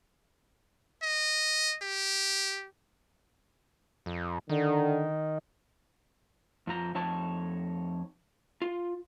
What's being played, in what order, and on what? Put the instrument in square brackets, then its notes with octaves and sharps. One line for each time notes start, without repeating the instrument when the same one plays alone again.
[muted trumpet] D#5
G4
[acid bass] F2
[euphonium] D3 [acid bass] D#3
[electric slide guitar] F2 F3 A#5
F2 D#4 C#5 A5
F4